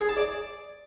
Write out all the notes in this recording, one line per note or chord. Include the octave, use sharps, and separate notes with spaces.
G#4
A5
D5